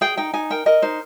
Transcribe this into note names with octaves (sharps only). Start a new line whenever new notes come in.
G#4 G5
D#4 G5
D#4 G#5
A#4 G5
A#4 D#5
D#4 C5